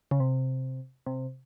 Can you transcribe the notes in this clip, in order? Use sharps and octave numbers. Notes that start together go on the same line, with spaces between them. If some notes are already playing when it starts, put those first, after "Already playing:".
C#3
C3
C3